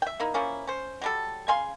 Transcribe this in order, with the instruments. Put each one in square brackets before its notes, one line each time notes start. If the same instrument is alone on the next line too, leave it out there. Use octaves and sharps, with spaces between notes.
[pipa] E5 G5
A#3 D#4 E4
F3 A#3 C#4 E4
C#4 C5
F#3 G3 A4
C#3 F5 G#5 C6